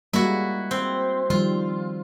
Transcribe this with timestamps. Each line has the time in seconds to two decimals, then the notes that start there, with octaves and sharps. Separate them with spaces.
0.13 G3 G#3 A#3 E4 F#4
0.71 C4
1.30 D#3 F3 G3 F4